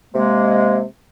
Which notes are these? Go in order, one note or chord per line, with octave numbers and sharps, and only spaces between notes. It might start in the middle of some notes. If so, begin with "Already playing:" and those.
C3 G#3 A#3